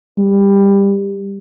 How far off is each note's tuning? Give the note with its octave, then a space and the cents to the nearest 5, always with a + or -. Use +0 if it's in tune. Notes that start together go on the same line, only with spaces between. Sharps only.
G3 +15